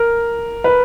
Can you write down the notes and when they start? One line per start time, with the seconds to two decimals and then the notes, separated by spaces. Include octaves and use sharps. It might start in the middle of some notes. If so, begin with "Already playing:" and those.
Already playing: A#4
0.64 B4